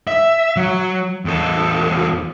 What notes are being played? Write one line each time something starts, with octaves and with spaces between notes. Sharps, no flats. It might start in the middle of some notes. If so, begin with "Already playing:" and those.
E5
F#3
E2 A4